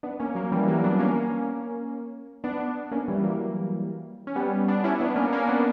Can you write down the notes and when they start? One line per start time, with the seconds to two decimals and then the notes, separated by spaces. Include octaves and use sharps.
0.03 B3 D4
0.20 A#3 C#4
0.35 F#3 A#3
0.52 E3 G3
0.67 F#3 A#3
0.84 B3 D4
0.99 A#3 C#4
2.44 B3 D4
2.91 A#3 C#4
3.08 E3 G3
3.23 F#3 A#3
4.27 C#4
4.36 G3 B3
4.68 B3 D4
4.84 C#4 E4
5.00 B3 D4
5.16 A#3 C#4
5.32 A#3 C#4
5.48 B3 D4